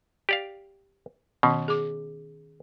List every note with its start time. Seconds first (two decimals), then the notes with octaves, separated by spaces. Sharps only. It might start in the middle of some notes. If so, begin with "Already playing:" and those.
0.29 G4 D5 F5
1.43 B2 D#3 C#4
1.68 G#4 D6